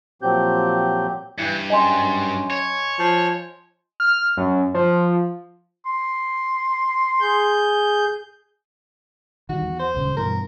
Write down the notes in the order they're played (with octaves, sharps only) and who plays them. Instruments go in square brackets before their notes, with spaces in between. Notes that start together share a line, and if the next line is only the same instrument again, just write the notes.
[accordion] A#2 F3 F#3 C4 G4 G6
[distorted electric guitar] G2 [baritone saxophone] E3
[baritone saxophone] F#2 [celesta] D#5 G#5 C6
[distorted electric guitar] C#5
[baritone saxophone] F3
[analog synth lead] F6
F#2
F3
[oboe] C6
[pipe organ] G#4 G6
[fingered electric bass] D#3 G3 [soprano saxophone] F#4
[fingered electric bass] E2
[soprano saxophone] C5
[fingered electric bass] D#1 C#2 C#3
[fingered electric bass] G2 B2 E3 [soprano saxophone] A#4